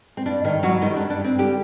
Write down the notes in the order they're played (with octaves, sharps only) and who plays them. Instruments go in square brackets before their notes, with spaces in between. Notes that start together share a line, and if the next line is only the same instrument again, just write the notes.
[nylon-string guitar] C4
G2 D4
G2 D#3 D#4
G2 F#3 F#4
D#3 G3 D#4
G2 D4
D4
G2 C4
D3 G3 G4